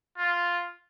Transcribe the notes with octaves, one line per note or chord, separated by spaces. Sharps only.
F4